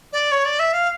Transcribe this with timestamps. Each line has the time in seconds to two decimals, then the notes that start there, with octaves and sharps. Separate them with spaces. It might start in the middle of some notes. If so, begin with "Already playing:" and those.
0.13 D5
0.31 C#5
0.45 D5
0.59 E5
0.73 F5